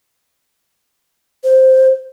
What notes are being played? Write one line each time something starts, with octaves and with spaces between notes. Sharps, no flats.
C5